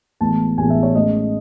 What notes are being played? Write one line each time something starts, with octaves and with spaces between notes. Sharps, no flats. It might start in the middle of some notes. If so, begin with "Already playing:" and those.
A1 A2 E3 G#3 B3 A5
A1 A2 E3 G#3 B3 G#5
E5
C#5
A2 G#3 C#4 D#5